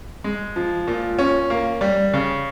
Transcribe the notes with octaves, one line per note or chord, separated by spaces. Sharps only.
G#3
F3
A#2
C#4
A#3
G3
C#3